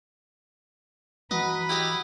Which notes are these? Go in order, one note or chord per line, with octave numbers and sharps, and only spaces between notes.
E3 F#4 B4 D#5 F#5 A#5
E4 G4 D#5